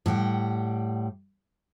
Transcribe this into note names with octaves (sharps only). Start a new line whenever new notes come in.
A2 G3 F#5 G5